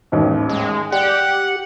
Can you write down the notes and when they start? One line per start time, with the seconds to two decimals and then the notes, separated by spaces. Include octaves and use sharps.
0.12 A1 D#2 G#2
0.49 G#3
0.92 G4 D5 F#5 G5